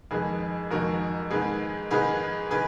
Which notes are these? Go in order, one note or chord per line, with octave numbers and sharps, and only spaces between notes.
F2 D#3 G#3 G#4 B4
F2 D#3 G#3 F#4 A#4
G#2 D#3 G#3 G#4 B4
G#2 D#3 G#3 G#4 B4
D#3 G#4 B4